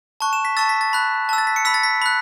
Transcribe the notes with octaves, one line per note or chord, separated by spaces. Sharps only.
A5 C#6 F#6
E7
B6
A5 C#6 E6 A6
B6
A6
B5 F#6
A5 E6
A6
B6
C#7
B5 E6 B6
A6
B6
B5 F#6